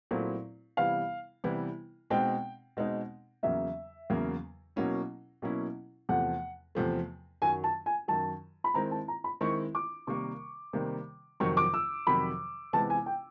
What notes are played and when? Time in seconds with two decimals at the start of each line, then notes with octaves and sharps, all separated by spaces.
0.11 A#2 F#3 A3 C4 E4
0.77 C3 E3 G3 B3 E4 F5
1.44 C3 E3 G3 B3 E4
2.10 B2 G#3 C4 D#4 G5
2.77 B2 G#3 C4 D#4
3.43 E2 C#3 F#3 A#3 E5
4.10 E2 C#3 F#3 A#3
4.76 B2 F#3 A#3 C#4 E4
5.42 B2 F#3 A#3 C#4 E4
6.09 E2 C3 F3 A3 F#5
6.75 E2 C3 F3 A3
7.42 F#2 D#3 F#3 G#5
7.64 A5
7.86 G#5
8.08 F#2 D#3 F#3 A5
8.64 B5
8.74 D#3 G#3 C4 E4 A#5
8.91 A5
9.08 A#5
9.24 B5
9.41 D#3 G#3 C4 E4 C#6
9.75 D6
10.07 C3 D#3 G3 A#3 C#6
10.73 C3 D#3 G3 A#3
11.40 F2 C3 D#3 F#3 C#6
11.57 D6
11.74 E6
12.07 F2 C3 D#3 F#3 B5
12.73 C3 E3 G#3 B3 A5
12.90 G#5
13.06 G5